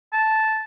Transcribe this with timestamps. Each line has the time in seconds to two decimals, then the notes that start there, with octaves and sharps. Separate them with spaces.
0.13 A5